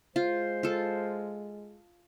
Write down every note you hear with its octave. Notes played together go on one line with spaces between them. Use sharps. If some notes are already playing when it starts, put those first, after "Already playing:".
G#3 F4 C5
F4 A4